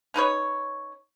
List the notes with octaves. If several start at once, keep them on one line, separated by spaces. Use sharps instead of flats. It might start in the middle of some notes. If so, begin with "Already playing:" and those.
C#4 D#4 B4 C#5